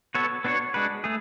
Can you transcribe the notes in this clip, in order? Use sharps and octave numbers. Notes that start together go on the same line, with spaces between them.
B3 F#4 A4 C#5
B3 D4 F#4 C#5
G#3 D4 F#4 B4
A3 G#4